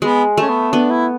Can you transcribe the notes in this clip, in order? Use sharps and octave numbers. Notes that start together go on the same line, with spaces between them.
G#3 B3
A3 C#4
B3
B3 D4
E4